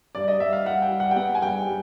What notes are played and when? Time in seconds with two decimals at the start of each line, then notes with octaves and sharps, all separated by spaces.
0.15 G2 D5
0.28 D#5
0.40 G2 E5
0.53 F5
0.65 G3 F#5
0.82 G5
0.91 G3
1.00 F#5
1.11 G5
1.16 B3 F#5
1.35 G#5
1.42 G2 G5
1.67 G3